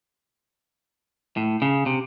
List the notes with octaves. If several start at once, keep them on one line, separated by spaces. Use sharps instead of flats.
A2
C#3
C3